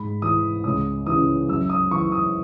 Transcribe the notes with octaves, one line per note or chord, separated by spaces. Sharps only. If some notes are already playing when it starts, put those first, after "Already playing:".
Already playing: G#2 B5
E3 D#6
C#2 D#6
C#3 E3 D#6
F#2 E6
D#6
E3 C#6
D#6